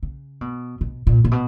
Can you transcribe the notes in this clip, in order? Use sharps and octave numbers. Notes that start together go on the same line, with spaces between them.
C#3
B2
B2
A#2
A#2
B2